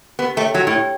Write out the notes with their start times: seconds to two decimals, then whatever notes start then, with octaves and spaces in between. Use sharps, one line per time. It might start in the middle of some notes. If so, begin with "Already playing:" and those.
0.19 B3 G4
0.37 A3 G5
0.41 C#5
0.54 F#3 G4
0.67 A2
0.73 C#5 G5